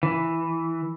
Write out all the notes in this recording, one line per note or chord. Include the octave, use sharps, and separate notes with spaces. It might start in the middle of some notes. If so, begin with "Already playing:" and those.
E3